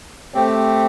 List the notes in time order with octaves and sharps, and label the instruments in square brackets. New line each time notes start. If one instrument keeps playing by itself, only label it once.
[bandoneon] A3 C4 G4